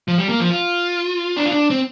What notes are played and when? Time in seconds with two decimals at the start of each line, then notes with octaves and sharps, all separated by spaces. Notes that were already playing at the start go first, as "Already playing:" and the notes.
0.08 F3
0.18 G3
0.29 A#3
0.40 F3
0.51 F4
1.37 D4
1.46 F4
1.51 D4
1.70 C4